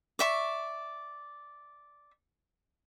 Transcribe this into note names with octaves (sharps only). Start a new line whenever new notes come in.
D5 E5 C#6